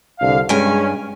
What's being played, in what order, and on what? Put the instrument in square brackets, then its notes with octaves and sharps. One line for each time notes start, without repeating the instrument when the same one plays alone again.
[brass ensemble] C2 D3 F5
[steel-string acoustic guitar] G2 G#5 [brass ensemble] G#3 C#4